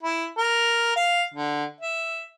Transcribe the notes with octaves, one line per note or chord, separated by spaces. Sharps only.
E4
A#4
F5
D3
E5